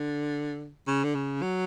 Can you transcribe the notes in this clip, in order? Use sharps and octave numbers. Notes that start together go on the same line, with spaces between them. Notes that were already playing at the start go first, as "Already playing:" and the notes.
Already playing: D3
C#3
D3
C#3
F#3